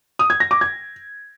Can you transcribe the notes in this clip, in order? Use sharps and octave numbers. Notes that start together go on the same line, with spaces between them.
D#6
G#6
A#6
D6
G#6